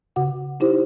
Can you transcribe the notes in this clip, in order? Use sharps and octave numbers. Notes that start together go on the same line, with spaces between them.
C#3 F#4 F#5
D#4 E4 G4 C5